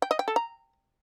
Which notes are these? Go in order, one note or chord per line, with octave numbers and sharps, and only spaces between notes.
G5
D#5
G5
A4
A#5